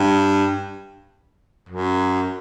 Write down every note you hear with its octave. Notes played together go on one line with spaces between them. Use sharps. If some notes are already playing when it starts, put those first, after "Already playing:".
Already playing: G2
F#2